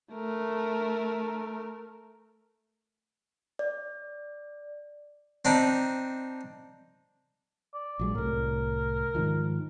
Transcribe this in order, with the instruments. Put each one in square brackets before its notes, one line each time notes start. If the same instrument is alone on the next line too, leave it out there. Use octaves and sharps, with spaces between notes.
[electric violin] A3 A#4
[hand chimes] D5
[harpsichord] C4 D4 D#4
[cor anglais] D5
[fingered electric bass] A#1 F#3 G#3
[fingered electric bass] C2 A2 [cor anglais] A#4
[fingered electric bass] G#2 D#3 F3